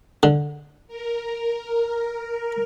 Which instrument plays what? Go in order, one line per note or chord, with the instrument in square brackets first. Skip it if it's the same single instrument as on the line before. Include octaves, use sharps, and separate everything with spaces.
[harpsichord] D3
[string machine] A#4